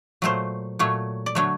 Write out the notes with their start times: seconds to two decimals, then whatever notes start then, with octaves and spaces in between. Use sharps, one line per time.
0.22 A#2 F#3 A3 C5
0.79 A#2 F#3 A3 C#5
1.26 D5
1.35 D3 F#3 A3 C#5